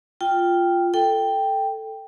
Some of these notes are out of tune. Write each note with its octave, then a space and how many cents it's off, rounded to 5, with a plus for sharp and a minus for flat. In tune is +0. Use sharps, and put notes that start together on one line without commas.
F4 +0 G5 +0
A4 +0 G5 +0